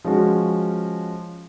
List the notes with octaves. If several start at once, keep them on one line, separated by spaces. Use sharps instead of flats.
F3 G#3 C#4 F#4